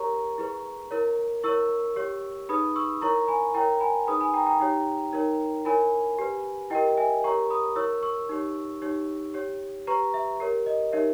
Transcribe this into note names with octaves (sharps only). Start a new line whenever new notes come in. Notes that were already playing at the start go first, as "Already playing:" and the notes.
Already playing: G4 A#4 C#5 A#5 C#6
E4 G#4 B4
E4 A#4 C#5
E4 A#4 C#5 C#6 E6
G4 C#5
D#4 G#4 B4 B5 D#6
C#6 E6
E4 A#4 C#5 A#5 C#6
G#5 B5
E4 A#4 C#5 G5 A#5
G#5 B5
D#4 G#4 B4 B5 D#6
G#5 B5
G5 A#5
G5 A#5
D#4 G4 C#5
D#4 A#4 C#5
E4 A#4 C#5 G#5 B5
G4 B4
E4 G4 A#4 D#5 G5
E5 G#5
G4 A#4 C#5 A#5 C#6
B5 D#6
E4 A#4 C#5 C#6 E6
C#6 E6
D#4 G4 C#5
D#4 G4 C#5
G4 C#5
G4 B4 A#5 C#6
E5
G4 A#4 C#5
D#5
D#4 G4 A#4 C#5 E5